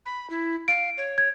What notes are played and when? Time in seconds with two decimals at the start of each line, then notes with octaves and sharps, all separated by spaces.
0.06 B5
0.30 E4
0.68 F5 D7
0.98 C#5
1.18 G#6